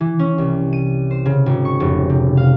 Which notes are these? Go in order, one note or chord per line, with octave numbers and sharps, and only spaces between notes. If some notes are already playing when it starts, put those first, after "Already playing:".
E3
C#4
C2
D#7
C5
C#3
G#1
C#6
F1
C3
F5